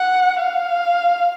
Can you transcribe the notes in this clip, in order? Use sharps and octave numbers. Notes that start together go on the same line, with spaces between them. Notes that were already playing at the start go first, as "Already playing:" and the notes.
Already playing: F#5
F5